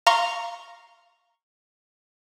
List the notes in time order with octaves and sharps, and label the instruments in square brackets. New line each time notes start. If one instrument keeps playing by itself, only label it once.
[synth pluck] F5 A#5 C6 C#6